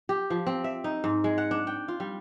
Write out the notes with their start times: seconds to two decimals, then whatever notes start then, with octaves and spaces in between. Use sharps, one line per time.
0.09 G4
0.30 F3
0.47 C4
0.64 E5
0.84 D#4
1.04 G#2
1.24 G#3
1.38 F#5
1.51 D4
1.67 G5
1.88 F4
2.00 G3